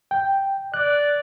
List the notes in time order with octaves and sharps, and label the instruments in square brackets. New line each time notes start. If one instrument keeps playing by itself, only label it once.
[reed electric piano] G5
[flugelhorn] D5 [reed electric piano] F#6